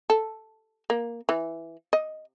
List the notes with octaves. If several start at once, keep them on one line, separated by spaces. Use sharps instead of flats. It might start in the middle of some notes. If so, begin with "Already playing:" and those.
A4
A#3
E3
D#5